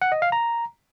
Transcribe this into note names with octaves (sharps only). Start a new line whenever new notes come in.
F#5
D#5
F5
A#5